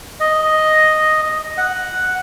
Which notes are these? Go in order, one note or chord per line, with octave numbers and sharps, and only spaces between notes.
D#5
F#5